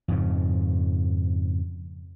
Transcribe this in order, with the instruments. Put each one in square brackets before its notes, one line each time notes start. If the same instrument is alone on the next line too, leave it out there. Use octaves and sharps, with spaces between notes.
[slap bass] F2 G#2 C#3